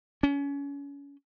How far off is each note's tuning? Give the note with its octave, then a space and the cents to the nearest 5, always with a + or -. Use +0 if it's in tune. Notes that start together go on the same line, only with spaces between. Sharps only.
C#4 +30